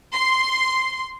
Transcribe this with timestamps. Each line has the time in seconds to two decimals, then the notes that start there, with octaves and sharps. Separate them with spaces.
0.13 C6